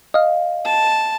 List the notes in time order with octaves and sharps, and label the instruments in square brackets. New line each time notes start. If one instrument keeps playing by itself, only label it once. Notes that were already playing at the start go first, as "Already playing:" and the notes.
[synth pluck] D#5 F5
[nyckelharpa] A5